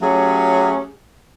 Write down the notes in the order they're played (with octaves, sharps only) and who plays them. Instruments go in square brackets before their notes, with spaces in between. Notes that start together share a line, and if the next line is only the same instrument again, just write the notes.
[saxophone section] F#3 A3 C#4 G4 G#4